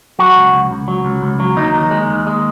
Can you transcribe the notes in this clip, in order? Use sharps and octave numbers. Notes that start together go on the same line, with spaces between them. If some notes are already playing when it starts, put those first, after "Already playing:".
F#3 F#4
C#2
C#2
C#2
F#3
C#2
C#2
F#3
D#2 D#4
D#2
G#3
D#2
G#3